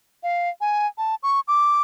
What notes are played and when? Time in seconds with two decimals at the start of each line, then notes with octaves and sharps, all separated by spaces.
0.23 F5
0.61 G#5
0.98 A5
1.23 C#6
1.48 D6